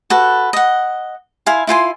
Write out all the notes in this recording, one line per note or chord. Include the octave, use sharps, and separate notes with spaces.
F#4 A4 B4
D#5 F#5
E4 F5 G#5 C6
E4 F4 G#5 C6